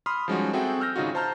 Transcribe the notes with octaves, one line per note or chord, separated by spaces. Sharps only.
B5 C6 D#6 F6
F3 G3 G#3 C#4 D#4 F#4
C4 F#4 G#4 A4 E5 G5
E6 F6 G6 A#6
G#1 C#3 D#4 F4 F#4
C5 A5 A#5 F6 G6